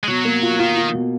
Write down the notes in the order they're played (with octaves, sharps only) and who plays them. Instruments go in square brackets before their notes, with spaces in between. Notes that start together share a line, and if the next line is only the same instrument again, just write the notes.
[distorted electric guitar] G#3
[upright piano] B2 [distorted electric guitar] F#3
[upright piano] A#3
F4
[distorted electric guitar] D#3 [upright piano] F4
[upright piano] F4
B2